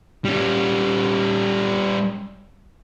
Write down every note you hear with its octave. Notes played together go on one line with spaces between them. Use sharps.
G3 C#4